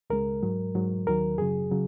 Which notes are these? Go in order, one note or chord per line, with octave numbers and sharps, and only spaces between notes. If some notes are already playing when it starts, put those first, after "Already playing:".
C#2 C#3 G#3 A#4
G#2 F#3
G#2 F#3
D#2 D#3 F#3 A#4
F#2 C#3 F#3 G#4
C#3 F#3